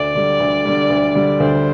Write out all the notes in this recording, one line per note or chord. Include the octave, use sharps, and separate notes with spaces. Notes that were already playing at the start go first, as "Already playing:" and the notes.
Already playing: D2 D5
D3 G3
D2
D3 G3
D2
D3 G3
D2 C5